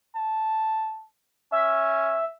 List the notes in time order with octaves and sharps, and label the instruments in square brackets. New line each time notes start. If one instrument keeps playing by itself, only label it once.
[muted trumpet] A5
[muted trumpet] C#4 [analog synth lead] E5